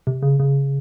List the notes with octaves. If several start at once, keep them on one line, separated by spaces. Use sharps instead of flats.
C3
C#3
C#3